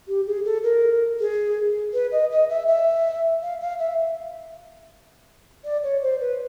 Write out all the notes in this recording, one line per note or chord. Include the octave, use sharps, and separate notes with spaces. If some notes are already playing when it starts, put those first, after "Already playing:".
G4
G#4
A4
A#4
G#4
B4
D#5
D#5
E5
E5
F5
F5
E5
D5
C#5
C5
B4